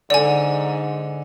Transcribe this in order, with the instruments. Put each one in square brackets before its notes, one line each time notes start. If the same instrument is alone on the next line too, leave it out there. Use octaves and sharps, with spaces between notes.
[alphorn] G#2 [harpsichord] D3 [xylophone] D5 G#5